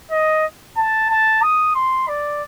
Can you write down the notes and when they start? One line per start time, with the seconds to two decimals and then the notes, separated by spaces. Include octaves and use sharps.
0.11 D#5
0.77 A5
1.10 A5
1.42 D#6
1.75 C6
2.08 D5